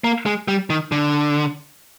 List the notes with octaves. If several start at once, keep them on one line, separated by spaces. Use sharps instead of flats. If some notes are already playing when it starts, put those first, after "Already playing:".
A#3
G#3
G3
D#3
D3